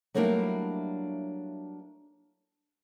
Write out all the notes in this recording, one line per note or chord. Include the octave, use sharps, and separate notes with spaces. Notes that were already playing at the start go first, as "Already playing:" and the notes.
F#3 G3 A3 A#3 D4 E4